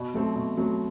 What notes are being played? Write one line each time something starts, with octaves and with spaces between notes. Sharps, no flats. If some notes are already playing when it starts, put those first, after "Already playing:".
Already playing: B2
F#3 A3 C4
B2
F#3 A3 C4